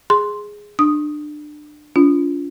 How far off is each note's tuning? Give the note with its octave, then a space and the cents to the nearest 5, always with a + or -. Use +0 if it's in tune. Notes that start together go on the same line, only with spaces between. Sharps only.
G#4 +0 C6 +0
D4 +25 D#6 +0
D4 -45 F4 -5